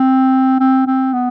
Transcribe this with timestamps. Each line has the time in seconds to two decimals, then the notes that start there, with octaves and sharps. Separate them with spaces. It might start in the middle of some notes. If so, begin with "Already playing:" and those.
Already playing: C4
0.60 C4
0.87 C4
1.13 B3